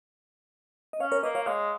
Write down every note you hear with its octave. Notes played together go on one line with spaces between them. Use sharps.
D#5
C#4 C#5 F5
A#4 C#5
A#3 B4 D#5
C#5 F5
G#3 C#5 F5